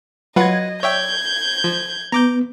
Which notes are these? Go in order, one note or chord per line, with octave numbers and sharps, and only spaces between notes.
F#3 F4 B4 D#5 F#5 G#6
C#5 D5 E5 G5 G6 G#6
F3
B3 A#5 D6 G6